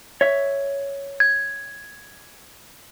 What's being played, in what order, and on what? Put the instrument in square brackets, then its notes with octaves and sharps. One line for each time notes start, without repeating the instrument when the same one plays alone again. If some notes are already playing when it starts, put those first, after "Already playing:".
[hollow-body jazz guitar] C#5 E5
[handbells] G#6